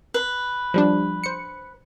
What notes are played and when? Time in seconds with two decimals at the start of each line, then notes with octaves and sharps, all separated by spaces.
0.14 B4
0.74 F3 G3 D4
1.24 C5 C#7